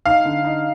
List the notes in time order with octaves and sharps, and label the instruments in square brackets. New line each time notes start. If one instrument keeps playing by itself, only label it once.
[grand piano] D#4 [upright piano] F5
[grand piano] D3
D#4